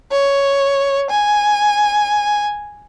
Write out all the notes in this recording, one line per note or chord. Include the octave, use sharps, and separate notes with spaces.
C#5
G#5